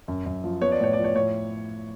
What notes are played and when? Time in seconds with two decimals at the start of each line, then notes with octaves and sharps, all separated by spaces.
0.08 F#2
0.26 F#2
0.44 F3
0.61 B3 C#5
0.72 D5
0.80 A2 C#5
0.93 F3 D5
1.04 C#5
1.15 A2 C#5